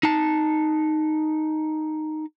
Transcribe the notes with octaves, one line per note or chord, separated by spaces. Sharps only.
D#4 A5